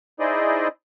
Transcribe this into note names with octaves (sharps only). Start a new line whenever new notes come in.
D#4 E4 G#4 C5 D5 D#5